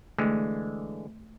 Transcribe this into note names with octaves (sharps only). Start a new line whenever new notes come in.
D3 E3 G#3 A3